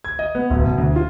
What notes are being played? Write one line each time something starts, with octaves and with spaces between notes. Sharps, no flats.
G#6
D#5
B3
D1
B2
D2
F4